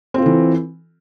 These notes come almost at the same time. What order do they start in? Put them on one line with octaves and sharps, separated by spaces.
C4 F4 A4 E3